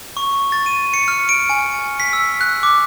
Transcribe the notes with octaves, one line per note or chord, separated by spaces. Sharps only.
C#6
A6
D#7
C#7
F6
D7
G#5
B6
E6
F#6
D6